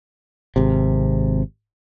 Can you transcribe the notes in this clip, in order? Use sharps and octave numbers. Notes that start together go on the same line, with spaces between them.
G#1 C3